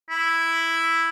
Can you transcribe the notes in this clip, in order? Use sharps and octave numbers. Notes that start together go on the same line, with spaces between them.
E4